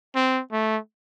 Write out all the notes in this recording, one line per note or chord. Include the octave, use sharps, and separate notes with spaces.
C4
A3